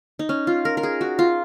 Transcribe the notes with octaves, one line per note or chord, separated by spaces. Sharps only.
D#4
C#4
F4
A#4
A#4
G#4
F#4
F4